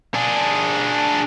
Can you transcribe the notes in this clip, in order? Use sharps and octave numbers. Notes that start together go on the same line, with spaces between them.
D4 G#4